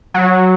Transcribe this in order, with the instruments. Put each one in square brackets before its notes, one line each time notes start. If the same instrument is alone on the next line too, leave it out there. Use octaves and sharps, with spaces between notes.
[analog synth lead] F#3